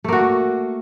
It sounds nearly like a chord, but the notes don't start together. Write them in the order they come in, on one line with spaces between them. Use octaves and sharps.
A3 A#3 F#4